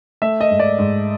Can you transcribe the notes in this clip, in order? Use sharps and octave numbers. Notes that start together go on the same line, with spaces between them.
A3 E5
D#5
G#2
D5
G#2